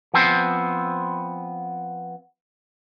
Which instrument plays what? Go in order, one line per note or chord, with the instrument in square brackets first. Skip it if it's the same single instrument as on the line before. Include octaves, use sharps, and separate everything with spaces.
[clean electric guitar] F3 B3 C4 C5